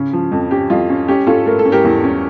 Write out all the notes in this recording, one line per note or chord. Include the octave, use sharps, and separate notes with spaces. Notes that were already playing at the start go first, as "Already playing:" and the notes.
Already playing: C#3 C#4
F3
F2
C#4 G4
F2 F4
C#4
C#4 G4
C#4 F4 A4
A3 A#4
A4
C#4
G4 A#4
E2
C#4